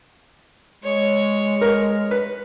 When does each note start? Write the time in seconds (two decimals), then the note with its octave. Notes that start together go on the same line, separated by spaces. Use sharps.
0.84 G#3 C#5
1.61 A#4
2.11 B4